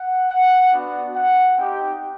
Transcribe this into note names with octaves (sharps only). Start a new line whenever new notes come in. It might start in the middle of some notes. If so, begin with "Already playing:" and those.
Already playing: F#5
F#5
B3 D4 F#4
F#5
C4 D#4 G4 G5